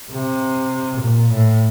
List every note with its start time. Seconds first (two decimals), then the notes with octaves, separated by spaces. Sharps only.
0.12 C3
1.02 A#2
1.33 A2